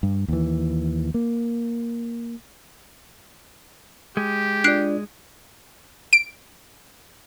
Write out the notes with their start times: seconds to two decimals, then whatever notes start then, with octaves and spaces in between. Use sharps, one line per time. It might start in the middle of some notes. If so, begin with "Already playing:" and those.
0.03 G2
0.28 D#2 E3
1.14 A#3
4.17 G#3 G4
4.64 D4 F4 D5 F#6 C7 D7
6.13 D7